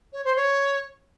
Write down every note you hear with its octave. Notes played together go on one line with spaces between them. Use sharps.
C#5
C5
C#5